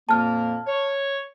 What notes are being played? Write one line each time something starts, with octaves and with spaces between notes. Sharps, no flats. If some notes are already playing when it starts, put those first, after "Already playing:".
F2 A#2 A#3 A5 F6
C#5